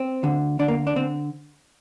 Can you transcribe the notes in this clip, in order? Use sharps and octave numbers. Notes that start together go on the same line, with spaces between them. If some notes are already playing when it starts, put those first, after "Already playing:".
Already playing: C4
D2 D3
D2 D3 D4
A#3
D4
D3 C4